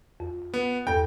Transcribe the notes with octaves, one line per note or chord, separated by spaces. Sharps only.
F2
B3
E2 G2 A4 G5